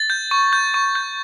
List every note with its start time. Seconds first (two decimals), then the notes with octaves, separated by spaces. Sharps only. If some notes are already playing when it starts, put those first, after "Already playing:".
Already playing: A6
0.10 G6
0.31 C#6
0.53 G6
0.74 C#6
0.95 G6